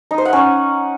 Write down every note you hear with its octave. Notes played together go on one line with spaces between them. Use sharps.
D#4
C5
F#5
C#4